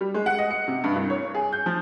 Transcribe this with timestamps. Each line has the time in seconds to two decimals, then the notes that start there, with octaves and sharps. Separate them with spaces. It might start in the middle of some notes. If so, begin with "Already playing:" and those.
0.01 G3
0.14 G#3
0.26 F#5
0.39 D#5
0.50 C#7
0.68 C3
0.84 G2
0.96 C2
1.10 C#5
1.34 G#4
1.53 G6
1.66 F3